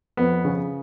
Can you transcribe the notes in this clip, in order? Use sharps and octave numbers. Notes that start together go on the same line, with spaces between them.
F2 B3
C#3